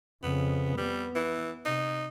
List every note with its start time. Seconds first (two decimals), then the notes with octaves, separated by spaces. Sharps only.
0.23 F2 C#3 B3
0.78 G3 B3
1.15 E3
1.65 C3 D#4